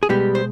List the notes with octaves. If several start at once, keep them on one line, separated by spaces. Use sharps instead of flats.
G#4
B2 G3 G#3 B3 G4
C5